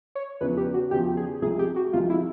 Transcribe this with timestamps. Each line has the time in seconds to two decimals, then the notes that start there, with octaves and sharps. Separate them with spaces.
0.15 C#5
0.41 E2 C#3 F3 B4
0.57 G4
0.74 F#4
0.91 E2 C#3 F3 G4
1.17 G#4
1.42 C2 C3 F3 G#3 G#4
1.59 G4
1.76 F#4
1.93 C2 C3 F3 G#3 F4
2.10 E4